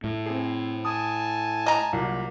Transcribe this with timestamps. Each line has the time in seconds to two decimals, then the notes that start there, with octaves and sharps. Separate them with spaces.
0.04 A2
0.26 C4 G#4
0.85 G#5 A5 D#6
1.66 D#5 A#5
1.93 C2 A#2 F#3 A#3